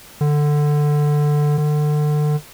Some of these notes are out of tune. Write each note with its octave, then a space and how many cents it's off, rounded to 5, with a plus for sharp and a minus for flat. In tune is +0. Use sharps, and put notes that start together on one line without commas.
D3 +10
D3 +30